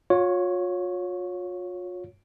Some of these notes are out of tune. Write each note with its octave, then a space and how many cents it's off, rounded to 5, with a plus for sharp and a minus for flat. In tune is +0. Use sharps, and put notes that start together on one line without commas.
F4 +40 C#5 +0